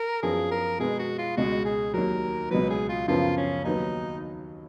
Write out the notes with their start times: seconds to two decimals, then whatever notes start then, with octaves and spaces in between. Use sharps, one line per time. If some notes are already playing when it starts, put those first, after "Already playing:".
Already playing: A#4
0.23 F#2 F3 B3 G#4
0.51 A#4
0.80 B2 G#3 B3 G#4
0.99 F#4
1.18 F4
1.37 C#2 B2 G#3 F#4
1.65 G#4
1.94 D#2 D#3 F#3 A#4
2.51 C#2 B2 F#3 B4
2.70 G#4
2.89 F4
3.08 F#2 C#3 F3 B3 F4
3.37 C#4
3.65 D#2 D#3 F#3 B3 D#4